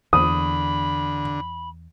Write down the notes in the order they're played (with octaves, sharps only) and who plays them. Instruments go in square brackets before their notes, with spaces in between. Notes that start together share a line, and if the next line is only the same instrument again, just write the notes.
[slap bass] E2 [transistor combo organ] D3 [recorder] B5 [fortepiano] D#6